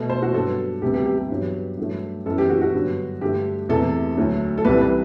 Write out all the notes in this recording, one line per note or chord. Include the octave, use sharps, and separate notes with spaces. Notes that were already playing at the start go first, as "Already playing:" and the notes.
Already playing: B2 A3
C5
F#4
G2 F#3 B3 A4
D2 C3 G3 B3 G4
G4
G4
G4
G2 F#3 B3
G2 F#3 A3
F#2 E3 B3 A4
G4
F#4
F#4
G2 D3 F#3 B3
G2 D3 A3 G4
E2 C3 E3 A3 A4
D2 D3 F#3 A3
A4
C2 C3 E3 G3 B4
B4